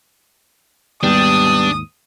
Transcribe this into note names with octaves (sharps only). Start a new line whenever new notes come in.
D#2 G#2 G3 B3 D4 G4 D#6